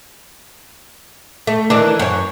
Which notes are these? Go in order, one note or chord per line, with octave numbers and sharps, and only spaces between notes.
A3
D#3 E3 D4
F#2 C#5